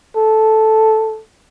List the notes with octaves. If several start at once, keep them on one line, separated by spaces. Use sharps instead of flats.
A4